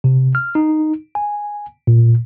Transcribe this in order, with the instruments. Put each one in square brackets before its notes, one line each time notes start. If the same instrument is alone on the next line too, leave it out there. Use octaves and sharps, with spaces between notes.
[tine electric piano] C3
F6
D#4
G#5
A#2